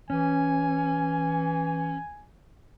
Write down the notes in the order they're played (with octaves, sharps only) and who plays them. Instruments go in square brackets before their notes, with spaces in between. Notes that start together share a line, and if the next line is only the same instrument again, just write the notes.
[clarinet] E3 [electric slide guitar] C#4 [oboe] G#5